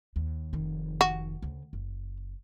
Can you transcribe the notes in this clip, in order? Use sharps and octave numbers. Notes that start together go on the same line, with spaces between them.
D#2
F1 D#3
F#4
D2 C#3
F#1